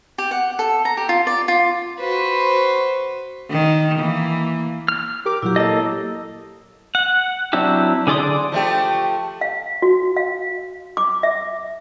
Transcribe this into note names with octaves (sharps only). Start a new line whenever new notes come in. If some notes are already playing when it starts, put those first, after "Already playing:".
G4
F#5
A4
A#5
G4
F4
D5
F4
F#4 B4 C5
D#3
E3 A#3
F6
G4 A#4 D6
A#2 F#3 E4 G4
A#3 A4 D#5 D#6 E6
F#5
F#3 C4 D4 E4 G4
D3 G#4 D5 C6 D#6
F3 A3 G4
F5
F#4
F5
D6
E5